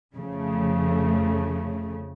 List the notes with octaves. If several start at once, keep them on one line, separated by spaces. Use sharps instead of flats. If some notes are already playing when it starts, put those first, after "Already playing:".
F2 C#3 F3 A3